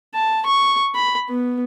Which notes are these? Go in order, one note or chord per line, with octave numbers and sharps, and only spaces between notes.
A5
C#6
B5
B3